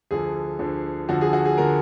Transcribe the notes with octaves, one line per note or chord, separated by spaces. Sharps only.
D2 D3 F3 G#4
D2 D3 F3
D2 D3 F3 F#4
G#4
F#4
G#4
D3 F3 A#4